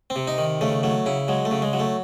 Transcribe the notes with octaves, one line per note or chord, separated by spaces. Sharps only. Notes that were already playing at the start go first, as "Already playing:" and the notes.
C4
C3
D#4
D#3
C#3 A3
F#3 A3
C#3 E4
F#3 G#3
A3
C#3
G#3
F#3
A3